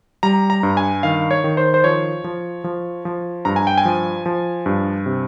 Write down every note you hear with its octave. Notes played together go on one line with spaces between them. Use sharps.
G3 A#5
A#5
G2
G#5
D#3 F5
C#5
D#3
C5
C5
F3 C#5
F3
F3
F3
G2 A#5
G#5
G5
G#5
F3
F3
G2
C3